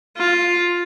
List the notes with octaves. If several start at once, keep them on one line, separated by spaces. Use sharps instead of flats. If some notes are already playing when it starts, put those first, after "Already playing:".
F4